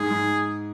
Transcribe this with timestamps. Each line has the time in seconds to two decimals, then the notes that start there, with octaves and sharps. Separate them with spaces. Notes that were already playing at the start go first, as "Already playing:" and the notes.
Already playing: G#2 G#4
0.11 G#2